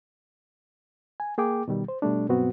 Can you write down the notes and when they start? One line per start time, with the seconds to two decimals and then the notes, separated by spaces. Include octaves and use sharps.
1.20 G#5
1.38 A#3 G#4 G5 D6
1.68 B2 D#3 G3
1.88 C5
2.02 B2 G3 A3 D4
2.29 G2 B2 F#3 B3 C4 F#4